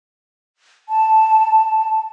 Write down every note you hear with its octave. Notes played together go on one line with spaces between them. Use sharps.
A5